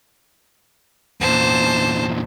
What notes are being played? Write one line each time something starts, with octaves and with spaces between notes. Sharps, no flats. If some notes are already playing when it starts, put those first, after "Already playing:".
E2 A#2 C5 A5